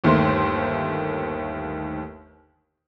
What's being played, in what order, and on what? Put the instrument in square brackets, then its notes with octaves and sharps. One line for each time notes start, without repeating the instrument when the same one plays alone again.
[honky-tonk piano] G1 D#2 D#3 A3 C5 C6